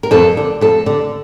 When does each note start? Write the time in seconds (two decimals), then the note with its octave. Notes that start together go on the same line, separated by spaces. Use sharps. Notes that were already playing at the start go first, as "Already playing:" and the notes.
0.03 A#4
0.11 F2 A4
0.37 D3
0.61 F2 A4
0.86 D3